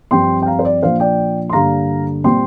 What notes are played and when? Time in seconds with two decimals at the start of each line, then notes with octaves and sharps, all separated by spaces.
0.11 G2 F3 C4 G5 C6
0.42 G5
0.46 F5 A#5
0.59 C5
0.65 D5
0.82 A#2 F3 D4 C5 F5
1.00 D5 G5
1.49 C6
1.53 G2 D3 A#3 D4 F5 A#5
2.24 A#2 G3 C4 G5 C6